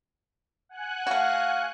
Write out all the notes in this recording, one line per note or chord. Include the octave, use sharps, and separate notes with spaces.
F#5 G#5 F#6
A3 F#4 F5